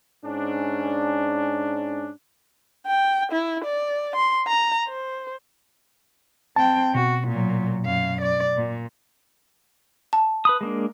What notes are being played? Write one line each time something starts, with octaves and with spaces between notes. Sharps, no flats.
G#2 C#4 D4
G5
E4
D5
C6
A#5
C5
C4 G5 A5
B2 F#4
A#2 F#3
F#2 F5
D5
A#2
A5
B4 B5 D#6
G#3 A#3 D4